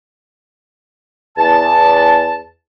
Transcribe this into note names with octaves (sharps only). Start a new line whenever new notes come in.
E2 A5